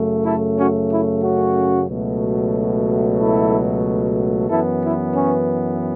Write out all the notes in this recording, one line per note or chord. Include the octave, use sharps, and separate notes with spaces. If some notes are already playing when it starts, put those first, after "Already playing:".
Already playing: F#2 C#3 A3
E4 A4
C#4 F#4
E4
C#4 F#4
C#2 B2 F#3 A3
E4 A4
F#2 E3 B3 E4 A4
E4
C#4